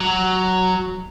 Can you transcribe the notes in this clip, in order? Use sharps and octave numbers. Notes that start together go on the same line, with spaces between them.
F#3